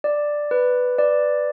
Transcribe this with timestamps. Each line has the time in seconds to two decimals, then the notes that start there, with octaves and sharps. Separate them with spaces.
0.04 D5
0.51 B4
0.98 D5